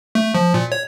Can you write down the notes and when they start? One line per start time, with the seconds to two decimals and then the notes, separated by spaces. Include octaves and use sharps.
0.15 A3
0.35 F3
0.54 A#2
0.72 C#5